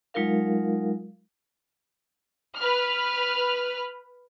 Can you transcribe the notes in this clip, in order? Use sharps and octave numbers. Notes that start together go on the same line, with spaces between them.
F#3 G#3 D#4 F4 A#4 F5
B4 F6